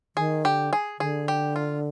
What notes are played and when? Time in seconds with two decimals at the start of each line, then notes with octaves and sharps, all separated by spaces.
0.16 D#3 G#4
0.44 D3 G4
0.73 G#4
0.99 D3 G#4
1.28 G4
1.56 F4